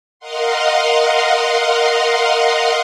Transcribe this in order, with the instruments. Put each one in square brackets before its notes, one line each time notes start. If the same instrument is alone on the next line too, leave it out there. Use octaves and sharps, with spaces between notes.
[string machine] A#4 D#5 F5 F#5 C6